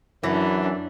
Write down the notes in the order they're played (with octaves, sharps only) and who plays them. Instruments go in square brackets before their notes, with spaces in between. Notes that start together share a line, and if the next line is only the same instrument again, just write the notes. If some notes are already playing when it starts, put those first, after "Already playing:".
[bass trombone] F#2 [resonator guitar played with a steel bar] E3 [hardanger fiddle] C#4 D4